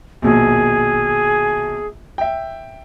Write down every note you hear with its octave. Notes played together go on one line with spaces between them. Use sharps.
A#1 D#2 B2 G#4
E5 G5